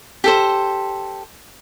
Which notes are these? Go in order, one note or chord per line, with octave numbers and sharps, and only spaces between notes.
G4 A4 C5